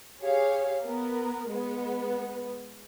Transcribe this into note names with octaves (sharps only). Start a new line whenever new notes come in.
G4 G#4 C#5 F5
B3 A#4
G#3 B3